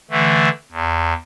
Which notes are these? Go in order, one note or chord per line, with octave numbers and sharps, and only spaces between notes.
D3 E3 A3
E2